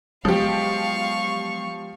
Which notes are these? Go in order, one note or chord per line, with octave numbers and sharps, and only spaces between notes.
F3 F#3 G#3 B3 G4 F5 C#6